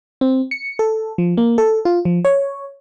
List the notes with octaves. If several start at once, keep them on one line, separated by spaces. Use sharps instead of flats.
C4
C#7
A4
F3
A#3
A4
F4
F3
C#5